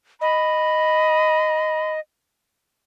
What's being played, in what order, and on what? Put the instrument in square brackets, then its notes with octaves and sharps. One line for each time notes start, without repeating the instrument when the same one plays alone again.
[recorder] D#5 [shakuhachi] B5